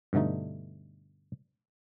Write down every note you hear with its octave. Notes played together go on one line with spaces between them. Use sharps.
G2 B2 D3 A3 D#4